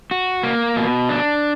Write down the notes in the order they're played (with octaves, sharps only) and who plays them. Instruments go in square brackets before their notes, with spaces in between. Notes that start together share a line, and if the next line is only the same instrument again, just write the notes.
[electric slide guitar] F#4
A#3
B2
D4